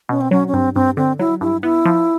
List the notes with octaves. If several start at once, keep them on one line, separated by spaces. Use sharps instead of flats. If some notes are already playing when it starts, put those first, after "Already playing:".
B2 C#4
C4
F#3 C#4
C#4
G2 C4
G2 C4
D3 C4
F#3 E4
G2 E4
B3 E4
F3